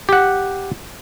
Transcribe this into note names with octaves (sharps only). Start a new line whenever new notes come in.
G4 F#5